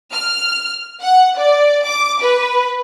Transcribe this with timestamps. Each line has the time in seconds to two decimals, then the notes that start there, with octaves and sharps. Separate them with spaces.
0.12 F6
1.01 F#5
1.36 D5
1.85 D6
2.21 B4